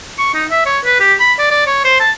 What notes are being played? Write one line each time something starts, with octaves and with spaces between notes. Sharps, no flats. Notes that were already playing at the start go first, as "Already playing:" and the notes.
C#6
D#4
E5
C#5
B4
G4
B5
D5
D5
C#5
C5
A5